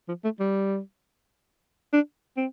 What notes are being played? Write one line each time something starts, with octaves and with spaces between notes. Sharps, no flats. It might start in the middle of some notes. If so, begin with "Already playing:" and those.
F3
A3
G3
D4
C4